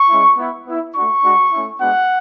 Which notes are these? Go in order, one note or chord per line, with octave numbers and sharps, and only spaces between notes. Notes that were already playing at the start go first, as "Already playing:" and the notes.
Already playing: C#6
G#3 C#4 E4
B3 E4
B3 E4
A3 D4 F#4 C#6
G#3 D4 F#4
A3 C#4 E4
G#3 B3 D4 F#4 F#5